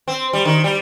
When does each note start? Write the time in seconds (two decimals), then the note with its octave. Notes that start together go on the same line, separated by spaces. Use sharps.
0.08 C4
0.33 G3
0.45 D#3
0.64 G3